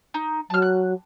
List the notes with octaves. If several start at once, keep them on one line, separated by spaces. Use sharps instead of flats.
D#4
F#3 A5 F6
F#6